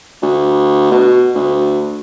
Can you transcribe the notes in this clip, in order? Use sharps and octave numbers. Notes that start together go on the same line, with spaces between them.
D2
B2
D2